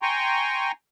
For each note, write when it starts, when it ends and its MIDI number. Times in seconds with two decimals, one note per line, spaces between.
0.02 0.72 79
0.02 0.72 80
0.02 0.72 82
0.02 0.72 84
0.02 0.72 85